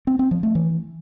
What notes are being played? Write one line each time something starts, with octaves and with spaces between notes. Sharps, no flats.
C4
C4
F3
A3
E3